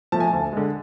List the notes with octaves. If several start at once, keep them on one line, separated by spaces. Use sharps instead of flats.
F3 A3 A5
G#5
A5
D2
D3 G#3